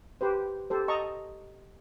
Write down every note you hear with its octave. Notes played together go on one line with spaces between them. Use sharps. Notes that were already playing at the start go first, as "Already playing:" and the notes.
G4 B4 C5
G4 A4 C5
D#5 A5 A#5 C#6